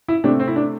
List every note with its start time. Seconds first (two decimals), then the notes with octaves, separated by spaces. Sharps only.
0.08 E4
0.24 C3 A3 C4 D4
0.40 C4
0.48 E4
0.56 D4